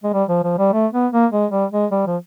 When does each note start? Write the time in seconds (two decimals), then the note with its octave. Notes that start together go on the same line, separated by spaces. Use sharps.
0.04 G#3
0.13 G3
0.29 F3
0.44 F3
0.58 G3
0.73 A3
0.93 B3
1.12 A#3
1.32 G#3
1.52 G3
1.72 G#3
1.91 G3
2.07 F3